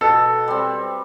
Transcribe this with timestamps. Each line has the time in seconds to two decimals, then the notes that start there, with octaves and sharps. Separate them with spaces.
0.01 B2 A4
0.48 G3 C4